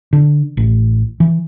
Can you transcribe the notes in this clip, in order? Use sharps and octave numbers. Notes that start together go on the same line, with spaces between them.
D3
A1
E3